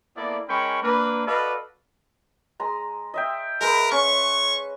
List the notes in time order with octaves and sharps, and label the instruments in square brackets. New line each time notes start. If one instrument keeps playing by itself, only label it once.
[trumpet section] A#3 B3 E4 A4 D5
G#3 C#4 A#4 G5 B5 C#6
A#3 D4 B4
F#4 A4 B4 D5 D#5 F5
[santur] G#3 A#5 C6
D#5 E5 G5
[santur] G#3 B4 [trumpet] A#4
[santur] C#4 [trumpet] C#6